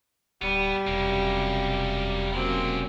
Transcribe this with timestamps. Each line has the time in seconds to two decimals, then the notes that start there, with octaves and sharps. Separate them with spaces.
0.42 D1 G3 B3
0.87 E1 F#2 C3 A#3 C#4
2.34 F#3 G#3 A#3 C4 C#4 D5